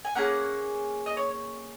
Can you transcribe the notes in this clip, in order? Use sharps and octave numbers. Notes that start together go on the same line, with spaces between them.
G#5
A#3 C#4 G#4 F#5
D#5
C#5